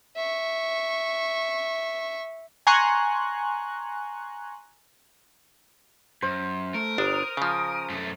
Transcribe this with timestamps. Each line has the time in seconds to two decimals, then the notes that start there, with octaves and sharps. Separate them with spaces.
0.17 E5 C#6
2.67 G#5 A#5 C6 C#6 F#6
6.22 F#2 C5
6.74 A3 A#4
6.98 G1 D4 D#6
7.37 C#3 F3
7.90 F#2 A3